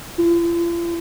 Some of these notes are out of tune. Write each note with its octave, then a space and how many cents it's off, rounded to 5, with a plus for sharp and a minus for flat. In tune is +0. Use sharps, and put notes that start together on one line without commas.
F4 -45